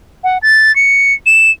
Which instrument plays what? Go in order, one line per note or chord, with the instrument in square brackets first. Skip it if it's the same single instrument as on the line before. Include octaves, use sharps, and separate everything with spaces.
[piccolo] F#5
A6
C#7
E7